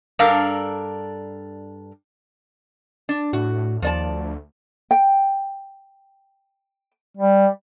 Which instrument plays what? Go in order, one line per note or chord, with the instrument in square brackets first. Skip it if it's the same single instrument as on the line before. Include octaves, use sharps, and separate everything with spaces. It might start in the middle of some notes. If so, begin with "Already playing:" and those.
[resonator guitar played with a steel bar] G2 D4 A4 A#4 F5 A#5
D4
[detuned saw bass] A2 [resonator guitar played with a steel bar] F#4
[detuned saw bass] D#2 [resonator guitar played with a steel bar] F3 D5 A5
[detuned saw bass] D2
[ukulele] G5
[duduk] G3